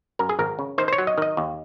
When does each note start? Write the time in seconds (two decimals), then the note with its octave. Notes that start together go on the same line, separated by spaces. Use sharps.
0.19 F#2 A#4
0.29 G#4
0.39 G#1 A#4
0.59 C#3
0.78 D#3 C5
0.88 C5
0.93 C#5
0.98 F#3
1.07 D#5
1.18 D#3 D#5
1.37 D#2